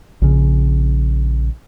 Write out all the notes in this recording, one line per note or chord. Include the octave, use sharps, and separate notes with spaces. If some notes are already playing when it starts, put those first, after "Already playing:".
A#1 C#3